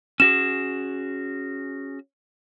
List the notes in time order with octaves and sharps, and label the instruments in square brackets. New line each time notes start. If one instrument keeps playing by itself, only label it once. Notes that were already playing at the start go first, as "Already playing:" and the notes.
[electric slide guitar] C#4 F#4 G#4 [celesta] E7